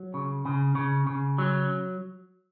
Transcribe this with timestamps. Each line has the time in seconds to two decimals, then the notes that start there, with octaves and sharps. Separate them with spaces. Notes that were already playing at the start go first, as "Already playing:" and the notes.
Already playing: F#3
0.14 C#3
0.45 C#3
0.75 C#3
1.07 C#3
1.38 F#3